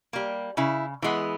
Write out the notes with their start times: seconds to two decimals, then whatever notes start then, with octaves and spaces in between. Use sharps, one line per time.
0.13 G3 A#3
0.57 C#3 E4
1.02 E3 G#3 B3